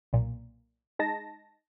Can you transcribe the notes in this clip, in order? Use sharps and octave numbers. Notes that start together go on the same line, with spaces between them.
B1 A#2
G#3 D#4 A5 A#6